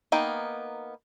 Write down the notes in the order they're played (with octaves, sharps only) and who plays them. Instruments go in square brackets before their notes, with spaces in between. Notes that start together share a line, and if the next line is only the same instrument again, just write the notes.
[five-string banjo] A#3 B3 D#4 G5